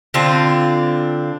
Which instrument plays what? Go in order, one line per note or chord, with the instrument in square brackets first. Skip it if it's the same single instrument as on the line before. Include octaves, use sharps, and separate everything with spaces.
[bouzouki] D3 C4 D4 F4